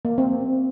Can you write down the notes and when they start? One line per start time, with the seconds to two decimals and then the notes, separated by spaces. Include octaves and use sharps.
0.05 A#3
0.18 C4